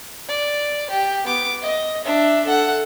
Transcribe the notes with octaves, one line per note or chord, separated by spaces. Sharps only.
D5
G4
B3 D6
D#5
D4 E5
A4 F#5